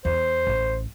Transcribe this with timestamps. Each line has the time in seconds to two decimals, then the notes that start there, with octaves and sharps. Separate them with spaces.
0.05 E2 C5
0.47 A1